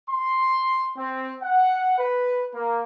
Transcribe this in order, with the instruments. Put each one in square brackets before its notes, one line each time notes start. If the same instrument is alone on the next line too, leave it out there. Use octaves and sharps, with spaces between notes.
[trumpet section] C6
C4
F#5
B4
A#3